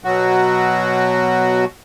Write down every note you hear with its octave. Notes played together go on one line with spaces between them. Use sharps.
B2 F#3 F#4